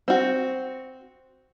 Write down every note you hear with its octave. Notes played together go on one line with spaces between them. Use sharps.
C4 F#4